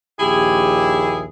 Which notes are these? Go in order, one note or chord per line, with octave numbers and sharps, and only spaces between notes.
A#1 D#2 E4 G4 G#4